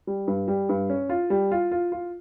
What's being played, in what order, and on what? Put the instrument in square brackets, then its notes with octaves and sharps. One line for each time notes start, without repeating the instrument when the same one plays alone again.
[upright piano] G3
G2
G3
G2
C#4
F4
G3
F4
F4
F4